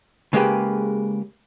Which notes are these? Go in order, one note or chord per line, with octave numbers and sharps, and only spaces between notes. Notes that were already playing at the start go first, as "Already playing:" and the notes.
C#3 G#3 A#3 G4 B4